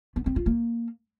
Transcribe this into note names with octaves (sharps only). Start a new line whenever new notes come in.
B3
C4
F4
A#3